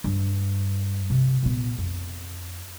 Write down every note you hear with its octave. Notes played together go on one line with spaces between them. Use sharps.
G2
C3
A#2 B3
F2